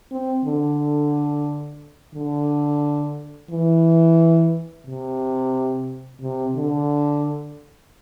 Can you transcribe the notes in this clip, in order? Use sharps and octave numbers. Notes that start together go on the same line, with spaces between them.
C4
D3
D3
E3
C3
C3
D3